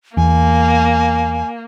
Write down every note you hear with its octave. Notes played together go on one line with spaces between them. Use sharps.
E2 A#3 G#5